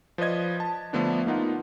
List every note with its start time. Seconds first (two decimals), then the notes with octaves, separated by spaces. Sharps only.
0.18 F3 B4 D5 D#5 G#6
0.60 A5
0.93 D3 F3 A3 B3 D4
1.26 A#3 B3 D#4 F4 F#5